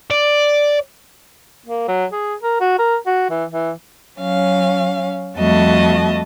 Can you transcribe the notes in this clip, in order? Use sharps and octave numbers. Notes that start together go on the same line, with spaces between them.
D5
A#3
F#3
G#4
A#4
F#4
A#4
F#4
E3
E3
F#3 C#4 F5
F2 G3 A3 F#4 D#5 A5